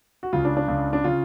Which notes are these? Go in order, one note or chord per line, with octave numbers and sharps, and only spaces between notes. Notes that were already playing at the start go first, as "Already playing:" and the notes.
F#4
C#2 C#3 F4
D4
D4
C#2 C#3
D4
C#3 F4